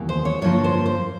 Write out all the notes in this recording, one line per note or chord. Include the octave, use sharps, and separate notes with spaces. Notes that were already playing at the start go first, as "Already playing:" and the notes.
Already playing: D#2 C#3 E3 G3 B3
C5
C#5
G2 D3 F3 A#3 C#5
C5
C5